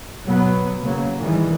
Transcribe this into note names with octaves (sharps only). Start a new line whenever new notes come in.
B2 F#3 B3
C#3 F#3 A#3
D#3 E3 G3 G#3